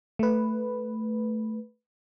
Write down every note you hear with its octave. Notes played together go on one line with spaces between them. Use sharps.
A3 B4